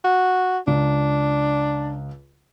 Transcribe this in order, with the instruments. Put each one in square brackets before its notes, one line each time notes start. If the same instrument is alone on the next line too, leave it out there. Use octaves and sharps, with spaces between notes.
[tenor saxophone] F#4
[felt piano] C#2 [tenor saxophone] D4